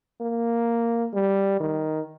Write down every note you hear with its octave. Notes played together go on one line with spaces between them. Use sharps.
A#3
G3
D#3